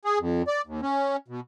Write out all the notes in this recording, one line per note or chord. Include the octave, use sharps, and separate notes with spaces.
G#4
F2
D5
D#2
C#4
B2